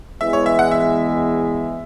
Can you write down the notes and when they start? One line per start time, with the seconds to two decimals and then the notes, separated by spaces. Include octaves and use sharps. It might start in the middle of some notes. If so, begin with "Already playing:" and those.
0.20 E2 E3 G#3 B3 E5
0.33 C#5
0.46 E5
0.59 F#5
0.71 E5